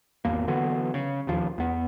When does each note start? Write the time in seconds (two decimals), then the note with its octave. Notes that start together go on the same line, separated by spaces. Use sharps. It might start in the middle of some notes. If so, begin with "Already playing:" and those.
0.25 G#1 E2 A#3
0.47 D3 E3 F#3 B3
0.94 C#3
1.27 E1 D#2 F3
1.58 E2 B3